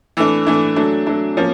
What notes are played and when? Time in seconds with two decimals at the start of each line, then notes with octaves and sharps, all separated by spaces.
0.17 E3 A3 D4
0.47 E3 A3 D4
0.76 F#3 A3 D4
1.07 F#3 A3 D4
1.37 F3 A#3 C#4